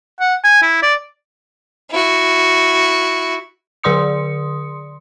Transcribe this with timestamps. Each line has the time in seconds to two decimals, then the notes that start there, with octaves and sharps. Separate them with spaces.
0.20 F#5
0.44 G#5
0.62 E4
0.82 D5
1.91 E4 F#4
3.83 D3 G#4 D5 C6 D#6 C#7